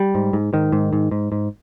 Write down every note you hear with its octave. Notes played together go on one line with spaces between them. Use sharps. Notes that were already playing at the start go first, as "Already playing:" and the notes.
Already playing: G3
G#2
G#2
G#2 D#3
G#2
G#2
G#2
G#2